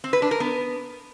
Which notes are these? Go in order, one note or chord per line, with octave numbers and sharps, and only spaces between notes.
C4
B4
D4
A#4
B3